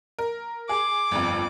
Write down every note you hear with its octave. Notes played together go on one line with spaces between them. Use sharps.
A#4
G#4 D6
G1 F2